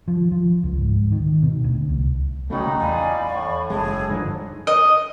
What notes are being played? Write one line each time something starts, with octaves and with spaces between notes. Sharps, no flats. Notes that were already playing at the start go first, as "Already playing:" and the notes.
F3
F3
C#2
G#2
D#3
B2
D2
C2
A#2 C#3 G3 A3 D#4 F#4 B5
E2 D5 F5 G#5 B5
A2 C#6
F#1 G#3 G#4 A5
A4
G2 D3 F3 D#4
D#5